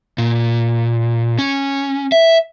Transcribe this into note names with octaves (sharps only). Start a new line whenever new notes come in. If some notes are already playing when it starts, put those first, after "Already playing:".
A#2
C#4
E5